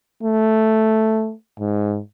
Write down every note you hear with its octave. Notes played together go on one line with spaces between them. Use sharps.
A3
G#2